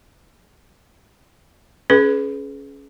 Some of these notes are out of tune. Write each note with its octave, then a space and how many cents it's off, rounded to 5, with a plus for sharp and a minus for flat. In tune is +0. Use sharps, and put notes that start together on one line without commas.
C#4 +0 G#4 +30 B4 +0